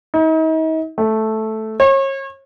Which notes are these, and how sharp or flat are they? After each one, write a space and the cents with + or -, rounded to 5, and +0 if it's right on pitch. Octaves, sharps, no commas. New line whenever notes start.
D#4 +40
A3 -5
C#5 -35